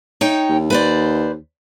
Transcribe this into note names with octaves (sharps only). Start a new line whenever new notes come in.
D#4 C#5 G5
D#2
B4 C5 D5